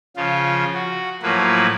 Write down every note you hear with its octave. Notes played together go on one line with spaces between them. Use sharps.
C#3 F3 F4
F#4
A2 F3 F#3 A#3 B4